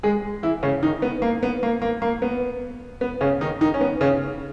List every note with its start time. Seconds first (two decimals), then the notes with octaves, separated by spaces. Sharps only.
0.03 G#3 G#4
0.43 E3 E4
0.63 C#3 C#4
0.83 D#3 D#4
1.02 B3
1.22 A#3
1.43 B3
1.63 A#3
1.82 A#3
2.02 A#3
2.22 B3
3.01 B3
3.21 C#3 C#4
3.41 D#3 D#4
3.61 D#3 D#4
3.74 C#4
3.81 B3
4.01 C#3 C#4